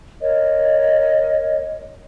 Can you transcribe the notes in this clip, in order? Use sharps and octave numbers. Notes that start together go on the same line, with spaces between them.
A#4 C#5 D#5